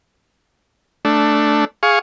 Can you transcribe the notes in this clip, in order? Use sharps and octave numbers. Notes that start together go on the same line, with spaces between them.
A3 D4
G#4 F5 C#6